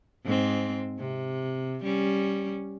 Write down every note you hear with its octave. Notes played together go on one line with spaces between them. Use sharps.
G#2 C4
C3
G3 C#4